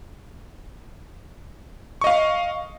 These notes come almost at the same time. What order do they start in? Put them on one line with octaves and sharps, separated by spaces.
C#6 D#5 F5